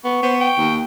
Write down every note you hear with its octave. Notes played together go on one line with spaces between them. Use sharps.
B3 C#6
B3 C5
G5
D#2